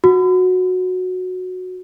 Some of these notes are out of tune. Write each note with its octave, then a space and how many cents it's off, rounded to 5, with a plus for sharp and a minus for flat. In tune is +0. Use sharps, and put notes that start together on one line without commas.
F#4 -10